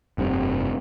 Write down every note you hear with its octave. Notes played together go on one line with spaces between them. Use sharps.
F1 G2 C3